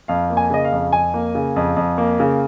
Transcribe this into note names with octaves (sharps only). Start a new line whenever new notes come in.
F2 F5
A#3
G#5
C#3 D#5
F5
F2
F2 G#5
A#3
C#3
F2
F2
A#3
C#3